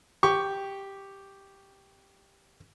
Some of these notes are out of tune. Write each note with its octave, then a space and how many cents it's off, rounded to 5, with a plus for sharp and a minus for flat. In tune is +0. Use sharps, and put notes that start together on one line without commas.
G4 +0 C#6 +10